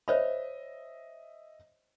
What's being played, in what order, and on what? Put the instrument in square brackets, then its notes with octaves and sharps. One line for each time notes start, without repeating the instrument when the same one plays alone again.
[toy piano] C5 C#5 B5 [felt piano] D#5 E5